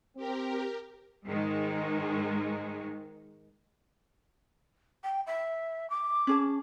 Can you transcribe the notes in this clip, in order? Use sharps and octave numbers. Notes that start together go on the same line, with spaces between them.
C4 G4 A#4
G#2 D#3 G#3
G5
E5
D6
C#4 G#4 A5